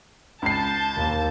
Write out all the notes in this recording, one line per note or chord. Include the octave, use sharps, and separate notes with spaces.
C#2 A5 G6 C7
D#2 A#3